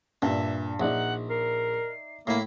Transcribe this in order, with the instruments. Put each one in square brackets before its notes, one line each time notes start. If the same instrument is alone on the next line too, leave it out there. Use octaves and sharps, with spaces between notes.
[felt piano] G2 [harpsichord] A#2 [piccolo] E5
[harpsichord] A#1 [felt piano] D#4 D5 E5 [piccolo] F#5
[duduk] A#4 [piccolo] C7
[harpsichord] A2 E4 [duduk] A#3 [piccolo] C7